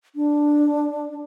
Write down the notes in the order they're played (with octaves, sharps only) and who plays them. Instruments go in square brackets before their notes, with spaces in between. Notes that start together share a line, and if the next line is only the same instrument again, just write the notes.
[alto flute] D4